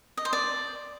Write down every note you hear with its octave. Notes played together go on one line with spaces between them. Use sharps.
D#5
C5
D5